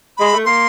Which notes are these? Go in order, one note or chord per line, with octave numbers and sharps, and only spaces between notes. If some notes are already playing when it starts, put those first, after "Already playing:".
G#3 B5
A3
A#3 C6